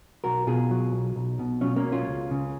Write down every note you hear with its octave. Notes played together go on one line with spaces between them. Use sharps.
B1 F#4 A#4
B2 F4 G#4
F#3
B1
B1
B2
F#3 C#4 F4
A#3 C#4
B1
C#4 F4
C#2
C#3